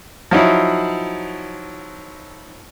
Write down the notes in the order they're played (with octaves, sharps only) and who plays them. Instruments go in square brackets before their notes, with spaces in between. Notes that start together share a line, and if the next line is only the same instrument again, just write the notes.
[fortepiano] F3 F#3 D#4 E4